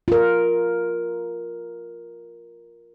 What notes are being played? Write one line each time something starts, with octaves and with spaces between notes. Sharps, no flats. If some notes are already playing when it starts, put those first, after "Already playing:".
F4 A#4